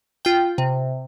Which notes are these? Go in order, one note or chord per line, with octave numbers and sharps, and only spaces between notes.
F4 G5
C3